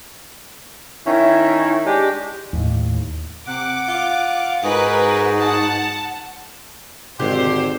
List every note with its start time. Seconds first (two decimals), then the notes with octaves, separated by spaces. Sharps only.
1.05 D#3 C#4 E4
1.85 G#3 D4 G4
2.53 D#2 A2
3.47 C3 F#5 D6 F#6
3.88 F4
4.63 G#2 D#4 F#4 G#4 A#4 B4
5.42 F#5 A5
7.19 G#1 D3 G4 C5